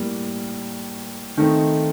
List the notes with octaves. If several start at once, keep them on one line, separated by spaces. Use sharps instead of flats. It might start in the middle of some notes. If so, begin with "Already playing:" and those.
Already playing: A2 G3 A#3
D#3 A3 C4 D#4